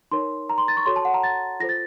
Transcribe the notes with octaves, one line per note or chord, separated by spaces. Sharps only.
D#4 A#4 C#5 C6
A#5
C6
A6
C#6
F#4 A4 C#5 C6
A5
F#5
A#5
A6
F4 A4 C5 A#6
A6